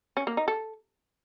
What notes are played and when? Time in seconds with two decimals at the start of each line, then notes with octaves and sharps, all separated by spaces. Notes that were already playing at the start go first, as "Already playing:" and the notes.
0.17 C#4
0.27 A#3
0.37 D#4
0.48 A4